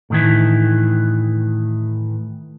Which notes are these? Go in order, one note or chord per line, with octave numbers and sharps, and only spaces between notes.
A2 D#3 E3